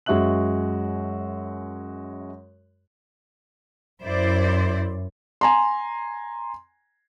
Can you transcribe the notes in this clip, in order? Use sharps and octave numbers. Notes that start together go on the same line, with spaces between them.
F#2 G#3 F#4 E5 F#6 F#7
F#2 E4 C5 D5
G#5 A#5 C6